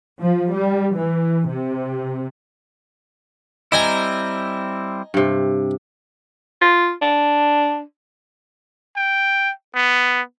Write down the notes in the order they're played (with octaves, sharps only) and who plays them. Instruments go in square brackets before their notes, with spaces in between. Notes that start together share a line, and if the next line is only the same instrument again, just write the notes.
[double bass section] F3
G3
E3
C3
[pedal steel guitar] G3 C4 E4 [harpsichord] D#5 G#5 A#5
[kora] G2 C3
[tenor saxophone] F4
D4
[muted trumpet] G5
B3